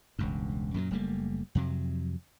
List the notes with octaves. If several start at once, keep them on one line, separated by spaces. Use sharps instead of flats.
E1 C#2 G2
F#2 A#2 D#3 F#3
F#1 G3 A3 A#3
F2 C3 F#3